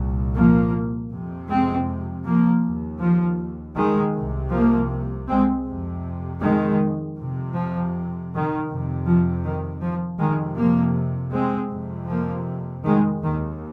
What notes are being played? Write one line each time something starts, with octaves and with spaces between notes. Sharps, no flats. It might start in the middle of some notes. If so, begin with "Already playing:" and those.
Already playing: C2 A#2
F3 A#3
F2 C3
G#3 C4
F3 A#3
D#2
F3
D#3 G#3
C2 C3
F3 A#3
G#3 C4
F2 C3
D#3 G#3
F2 C3
F3
D#3
F2 C3
F3
D#3
F3
F2 C3 D#3 G#3
F3 A#3
G#3 C4
F2 C3
F3 A#3
D#3 G#3
D#2 D#3